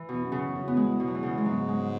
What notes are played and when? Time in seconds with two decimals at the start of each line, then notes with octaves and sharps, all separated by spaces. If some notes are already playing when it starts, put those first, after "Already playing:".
Already playing: E3
0.09 E2 B2
0.24 F#2
0.32 C#3
0.54 F#2
0.63 E2
0.68 B3
0.77 E2 G#3
1.00 B2
1.08 F#3
1.15 E3
1.23 C#3
1.38 G#3
1.46 G#2 F#3
1.69 G#3